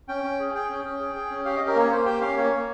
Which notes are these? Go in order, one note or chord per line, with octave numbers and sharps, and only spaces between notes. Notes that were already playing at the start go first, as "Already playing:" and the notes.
C#4 G5
C#4
G#4
G#4 G5
C#4
C#4
G#4
G#4
C#4
G4 F5
C#4 D#5
A#4
A#3 C#5
A#3 C5
G4 G5
C#4 F5
A#3 C#5
A#3